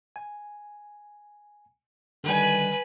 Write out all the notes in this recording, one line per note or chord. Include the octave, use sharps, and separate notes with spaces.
G#5
D3 D#3 G3 B4 G#5